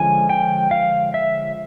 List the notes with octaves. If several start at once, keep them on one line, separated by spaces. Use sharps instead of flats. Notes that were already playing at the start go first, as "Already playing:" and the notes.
Already playing: D3 F3 G#3 C#4 G#5
G5
F5
E5